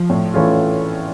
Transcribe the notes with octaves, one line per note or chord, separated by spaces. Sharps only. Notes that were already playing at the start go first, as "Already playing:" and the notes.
Already playing: F3
A2
E3 A3 C#4 F4